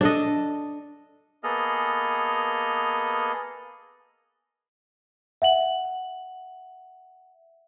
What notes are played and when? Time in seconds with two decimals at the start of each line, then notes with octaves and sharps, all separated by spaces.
0.01 D4 A4 D#5
1.44 A#3 B3 G#4 A4 D#5 F6
5.42 E5 F#5 F#7